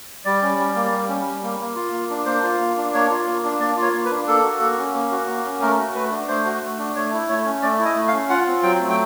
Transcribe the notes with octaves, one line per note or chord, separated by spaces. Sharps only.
G3 D5
C#4
G3
A#3
G3
C#4
G3
A#3
A#3
F4
A#3
D4
A#3 C5
F4
A#3
D4
A#3 C#5
F4
A#3
D4
A#3 D5
F4
C#5
A#3
B4
D4
A#3 A4
F#4
A#3
C#4
A#3
F#4
A#3
C#4
A3 A#4
F#4
A3 B4
D4
A3 C5
F#4
A3
D4
A3 C#5
E4
A3 C#5
C#4
A3 D5
E4
D#5
A3
F5
C#4
F4 F#5
C4
F#3 G5
A3
G5